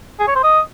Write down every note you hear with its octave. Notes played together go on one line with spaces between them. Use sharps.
G#4
C#5
C5
D#5